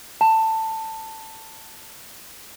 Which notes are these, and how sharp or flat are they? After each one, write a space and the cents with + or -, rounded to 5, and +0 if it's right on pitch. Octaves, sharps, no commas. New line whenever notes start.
A5 +15